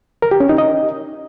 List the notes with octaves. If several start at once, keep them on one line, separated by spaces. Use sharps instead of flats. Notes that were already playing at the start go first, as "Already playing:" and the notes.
A#4
G4
C#4
D#4
D#5